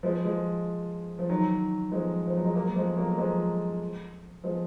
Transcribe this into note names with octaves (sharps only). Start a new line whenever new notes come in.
F3 G#3
F3 G#3
F3
D#3 F#3
F3 G#3
F3
F#3
G#3
F#3 A#3
F3 G#3
F#3 A#3
F3 G#3
F3 G#3